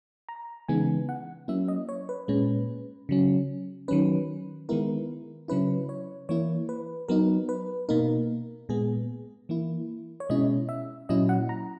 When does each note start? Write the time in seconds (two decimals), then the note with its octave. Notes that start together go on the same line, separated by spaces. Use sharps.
0.29 A#5
0.68 C#3 E3 G#3 B3 D#4 G#5
1.09 F#5
1.48 F#3 A#3 C#4 E4 E5
1.68 D#5
1.89 C#5
2.09 B4
2.28 A#2 G#3 C#4
3.09 C#3 F#3 C#4
3.88 D#3 F#3 C#4 B4
4.69 D#3 G#3 B3 E4 A#4
5.48 C#3 F#3 C#4 E4 B4
5.89 C#5
6.29 E3 A#3 E4 C#5
6.69 B4
7.08 F#3 B3 D#4 A#4
7.49 B4
7.89 B2 A#3 D#4 A#4
8.69 A#2 G#3 B3 G#4
9.49 E3 A#3 E4
10.20 C#5
10.29 B2 G#3 C#4 E4 D#5
10.69 E5
11.09 A#2 F#3 C#4 E4 D#5
11.29 F#5
11.49 A#5